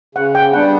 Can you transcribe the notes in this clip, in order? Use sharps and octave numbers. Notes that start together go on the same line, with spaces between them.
C#3 F#5
G5
G3 B3 D4 F#5